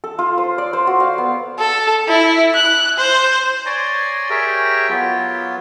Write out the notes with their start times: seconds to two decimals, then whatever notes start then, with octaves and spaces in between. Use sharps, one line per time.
0.04 A4
0.19 F4
0.38 C5
0.58 D5
0.73 C5
0.87 F#4
1.00 F5
1.18 B3
1.59 A4
2.08 E4
2.55 F#6
2.98 C5
3.66 C#5 D5 G#5 A#5 C6
4.30 G4 G#4 A#4 C#5 E5 G5
4.90 F#3 B3 F4